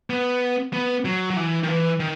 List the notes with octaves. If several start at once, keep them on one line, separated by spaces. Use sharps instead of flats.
B3
B3
F#3
F#3
E3
D#3
E3
D#3